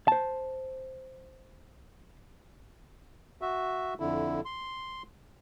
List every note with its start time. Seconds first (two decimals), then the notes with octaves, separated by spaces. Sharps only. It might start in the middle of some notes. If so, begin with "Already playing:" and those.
0.08 C5 A5
3.41 F#4 E5
4.00 F2 D3 E4
4.45 C6